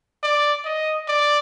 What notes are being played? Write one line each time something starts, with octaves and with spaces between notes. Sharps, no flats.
D5
D#5
D5